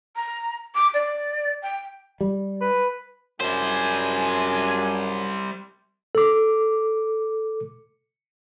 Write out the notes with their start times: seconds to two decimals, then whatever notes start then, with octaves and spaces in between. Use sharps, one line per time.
0.16 A#5
0.75 D6
0.94 D5
1.62 G5
2.21 G3
2.61 B4
3.40 F#2 G3 G#3 D4 C5 G#5
6.15 A4 D6